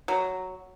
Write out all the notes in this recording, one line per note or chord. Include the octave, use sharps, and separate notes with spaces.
F#3